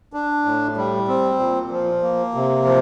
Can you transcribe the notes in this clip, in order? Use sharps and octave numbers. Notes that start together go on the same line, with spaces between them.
D4
A2
G3
C4
A#2
F3
A#3
C3
F3